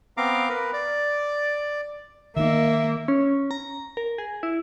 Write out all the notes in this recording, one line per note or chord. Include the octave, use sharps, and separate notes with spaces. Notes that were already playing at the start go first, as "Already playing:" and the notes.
B3 C4 F5 A#5 D6
A#4 B4
D5
D#3 A#3 D#4 E5
C#4
A#5
A#4
G#4
E4